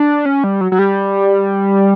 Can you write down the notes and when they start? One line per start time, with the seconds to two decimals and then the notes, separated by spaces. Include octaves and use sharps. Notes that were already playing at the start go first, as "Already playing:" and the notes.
Already playing: D4
0.25 C#4
0.44 G3
0.61 F#3
0.72 F#3
0.79 G3